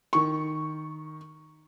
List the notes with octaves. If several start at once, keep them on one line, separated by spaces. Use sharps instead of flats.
D#3 C#6